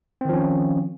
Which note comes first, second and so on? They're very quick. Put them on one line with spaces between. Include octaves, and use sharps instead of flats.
C4 D#3 F3 C#4